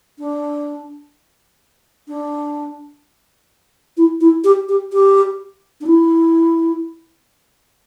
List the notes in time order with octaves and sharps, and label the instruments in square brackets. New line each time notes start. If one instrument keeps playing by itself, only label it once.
[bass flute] D4
D4
E4
E4
G4
G4
G4
D4
E4